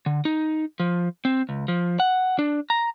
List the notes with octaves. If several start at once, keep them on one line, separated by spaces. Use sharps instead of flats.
D3
D#4
F3
C4
C#2
F3
F#5
D4
A#5